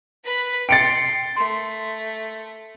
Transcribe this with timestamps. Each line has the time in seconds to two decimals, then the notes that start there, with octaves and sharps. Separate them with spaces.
0.24 B4 B5
0.69 G5 C6 A6 C#7 D7
1.36 A3 C6